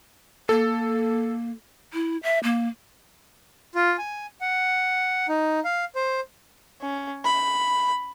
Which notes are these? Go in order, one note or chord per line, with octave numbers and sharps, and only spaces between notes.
A#3 A4
E4
E5
A#3
F4
G#5
F#5
D#4
F5
C5
C#4
B5